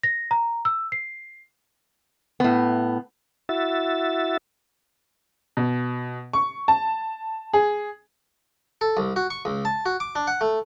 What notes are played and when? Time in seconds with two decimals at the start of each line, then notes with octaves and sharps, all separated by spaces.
0.03 A#6
0.31 A#5
0.65 E6
0.92 C7
2.40 A2 B3
3.49 E4 F#4 E5 A6
5.57 B2
6.33 C#6
6.68 A5
7.53 G#4
8.81 A4
8.97 C2
9.16 F#4
9.30 C#6
9.45 C#2
9.65 A5
9.86 F#4
10.00 D6
10.15 D4
10.28 F#5
10.41 A3